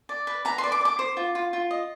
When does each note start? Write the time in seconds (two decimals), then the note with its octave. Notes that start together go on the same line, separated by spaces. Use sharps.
0.09 D5
0.27 B4
0.45 B4 A#5
0.58 C6
0.63 D5
0.72 D6
0.81 D5
0.85 D6
0.99 C5
1.17 F4
1.35 F4
1.53 F4
1.71 D#5